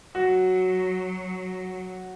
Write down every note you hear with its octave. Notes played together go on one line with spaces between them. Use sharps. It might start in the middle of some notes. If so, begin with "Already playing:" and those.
F#3 F#4